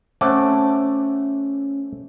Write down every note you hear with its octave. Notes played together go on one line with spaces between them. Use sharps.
A3 C4 C#4 F#5 D6